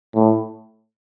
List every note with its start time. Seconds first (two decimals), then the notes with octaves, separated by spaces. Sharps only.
0.15 A2